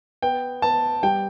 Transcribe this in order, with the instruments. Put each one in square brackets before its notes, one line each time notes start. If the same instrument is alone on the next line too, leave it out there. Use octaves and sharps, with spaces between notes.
[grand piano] B3 G5
B3 A5
G3 G5